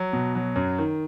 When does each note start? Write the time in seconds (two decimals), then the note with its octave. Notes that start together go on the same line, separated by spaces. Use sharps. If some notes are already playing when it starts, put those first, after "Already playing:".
Already playing: F#3
0.13 B2
0.35 F#3
0.56 F#2
0.78 D#3